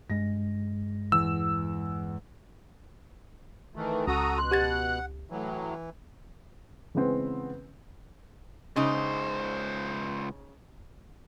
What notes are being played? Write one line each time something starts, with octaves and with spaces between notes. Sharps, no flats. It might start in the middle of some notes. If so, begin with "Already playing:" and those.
G2 G#3 A#6
E2 E6
D#3 E3 A3
C#2 C#4 F#4 A4 A#5 D#6
B2 C6 F#6
G4 F#5 G#6 A6
A2 E3 F#3
C#3 E3 G#3 B3 C4
C#2 C#3 D#4 C5